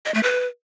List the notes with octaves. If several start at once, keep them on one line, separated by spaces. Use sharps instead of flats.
D#5
A3
B4